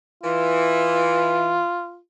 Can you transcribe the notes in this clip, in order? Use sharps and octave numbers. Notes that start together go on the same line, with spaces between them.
E3 F4